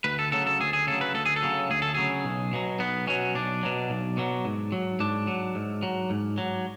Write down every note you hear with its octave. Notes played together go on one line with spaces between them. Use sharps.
D2 B4
A4
C#3 F#3 A4
A4
D2 G#4
G#4
C#3 F#3 A4
B4
D2 A4
G#4
A4
C#3 F#3
D2 G#4
A4
C#3 F#3 G#4
B1
B2 F#3
B1 B3
B2 F#3 C#4
B1 D4
B2 F#3
B1
B2 F#3
G#2
F#3
G#2 D4
F#3
G#2
F#3
G#2
F#3